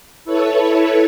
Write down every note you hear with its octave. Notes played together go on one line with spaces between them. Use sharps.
E4 A4 B4 C#5